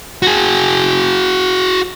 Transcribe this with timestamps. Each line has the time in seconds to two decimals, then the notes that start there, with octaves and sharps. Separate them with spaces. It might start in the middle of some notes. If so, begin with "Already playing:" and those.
0.22 F#4 G#4